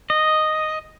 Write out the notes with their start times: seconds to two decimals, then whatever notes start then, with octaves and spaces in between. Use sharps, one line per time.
0.10 D#5